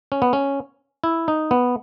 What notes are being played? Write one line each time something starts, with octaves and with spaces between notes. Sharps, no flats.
C#4
B3
C#4
E4
D#4
B3